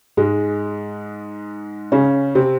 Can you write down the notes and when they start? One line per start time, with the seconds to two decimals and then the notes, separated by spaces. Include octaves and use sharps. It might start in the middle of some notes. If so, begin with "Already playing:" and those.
0.17 G#2 G#3
1.92 C#3 C#4
2.35 C3 C4